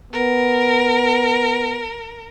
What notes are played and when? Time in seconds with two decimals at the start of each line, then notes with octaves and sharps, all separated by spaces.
0.13 B3 A#4